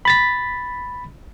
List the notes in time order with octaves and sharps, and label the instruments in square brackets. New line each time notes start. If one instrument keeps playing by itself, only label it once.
[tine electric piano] B5 A6 B6